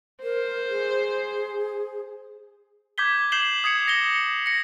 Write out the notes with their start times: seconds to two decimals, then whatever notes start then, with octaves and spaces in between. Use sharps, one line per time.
0.23 A#4 C5
0.69 G#4
2.98 D6 G6 G#6 B6 G7
3.32 D6 G6 C7 E7 F#7 G7
3.64 D#6 G#6 C7 C#7
3.88 A#6 C#7 G7
4.46 A#6 C#7